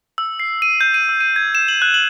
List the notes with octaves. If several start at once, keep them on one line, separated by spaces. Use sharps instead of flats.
E6
C7
D#7
G6
D#7
E6
D#7
G#6
E7
F#7
F#6
F#7